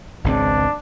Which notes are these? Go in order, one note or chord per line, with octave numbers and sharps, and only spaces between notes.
G#1 C#2 C4 D4